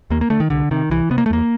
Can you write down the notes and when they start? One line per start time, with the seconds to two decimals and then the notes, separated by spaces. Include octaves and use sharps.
0.10 D#2 A#3
0.21 A#3
0.30 D3 A3
0.40 D#3
0.50 C2 D3
0.71 C3 D#3
0.90 C2 E3
1.11 C3 B3
1.18 A#3
1.26 A3
1.30 E2 A#3